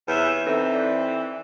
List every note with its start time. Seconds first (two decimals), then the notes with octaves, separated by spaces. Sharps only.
0.08 E2 C3 B4 C#5 E5
0.47 E3 C4 D#4 A4 B4
0.74 D5